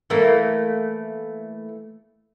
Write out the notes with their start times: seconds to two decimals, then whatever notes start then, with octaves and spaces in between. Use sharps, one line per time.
0.10 E3 A3 A#3